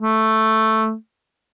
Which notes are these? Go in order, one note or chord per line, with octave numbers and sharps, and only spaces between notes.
A3